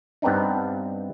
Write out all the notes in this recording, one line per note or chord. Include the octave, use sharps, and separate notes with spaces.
G2 B3 C4 D4 D#4